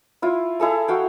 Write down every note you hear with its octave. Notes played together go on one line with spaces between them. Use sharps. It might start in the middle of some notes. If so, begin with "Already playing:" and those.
E4 F4
E4 G#4 A4 A#5
F#4 F5 G5